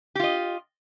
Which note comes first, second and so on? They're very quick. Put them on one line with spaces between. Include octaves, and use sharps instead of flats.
G4 F4 D#5